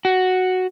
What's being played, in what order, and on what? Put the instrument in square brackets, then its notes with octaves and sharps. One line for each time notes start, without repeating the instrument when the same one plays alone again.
[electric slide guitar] F#4